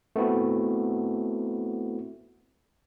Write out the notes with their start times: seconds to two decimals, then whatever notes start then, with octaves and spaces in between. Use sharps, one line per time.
0.16 A3 B3 C4 E4 F#4